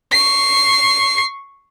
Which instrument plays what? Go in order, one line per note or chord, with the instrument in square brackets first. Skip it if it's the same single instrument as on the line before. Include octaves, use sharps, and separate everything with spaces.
[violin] C#6 C7